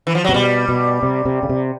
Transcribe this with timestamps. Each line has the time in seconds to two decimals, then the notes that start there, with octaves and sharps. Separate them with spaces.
0.07 E3
0.15 F3
0.24 F#3
0.29 C3
0.33 B2 G3
0.69 B2
1.03 C3
1.25 C3
1.43 C#3
1.49 C3